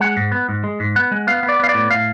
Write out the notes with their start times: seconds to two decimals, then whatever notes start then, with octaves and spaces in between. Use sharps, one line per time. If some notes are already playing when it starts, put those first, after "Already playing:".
0.01 G#3 F#5
0.17 G#2
0.32 B3
0.49 G#2
0.64 G#3
0.80 G#2
0.96 B3 F#5
1.11 G#3
1.27 B3 F5
1.43 B3
1.49 D5
1.59 B3 F5
1.69 D5
1.74 A2
1.91 A2 F5